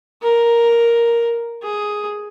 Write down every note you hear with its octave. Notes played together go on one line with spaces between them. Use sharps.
A#4
G#4